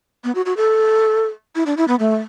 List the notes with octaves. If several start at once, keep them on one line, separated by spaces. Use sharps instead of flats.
B3
F#4
F#4
A4
E4
D4
E4
B3
A3